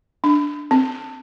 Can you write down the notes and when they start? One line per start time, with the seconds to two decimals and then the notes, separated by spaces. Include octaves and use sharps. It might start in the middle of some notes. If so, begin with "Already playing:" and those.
0.24 D4
0.71 C4